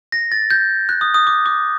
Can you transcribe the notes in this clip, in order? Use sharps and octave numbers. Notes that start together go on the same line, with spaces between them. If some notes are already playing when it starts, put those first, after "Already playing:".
A#6
A6
G6
F#6
D#6
D#6
D6
D6